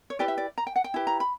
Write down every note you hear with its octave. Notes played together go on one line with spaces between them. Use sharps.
C#5
E4 G4 B4 D5
E5
D5
A#5
G5
F#5
G5
E4 G4 B4
A#5
B5